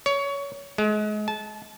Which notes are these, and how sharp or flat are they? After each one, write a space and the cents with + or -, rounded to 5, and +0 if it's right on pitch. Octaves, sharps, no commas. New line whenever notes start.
C#5 +20
G#3 +30
A5 -25